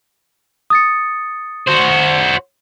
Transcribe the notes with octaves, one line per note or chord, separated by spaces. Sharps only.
D#6 A6 C#7
F#4 C5